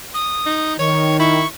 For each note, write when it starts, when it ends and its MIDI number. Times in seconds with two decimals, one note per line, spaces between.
0.14 0.73 87
0.46 0.76 63
0.79 1.42 51
0.79 1.16 73
0.79 1.17 85
1.19 1.44 64
1.19 1.47 85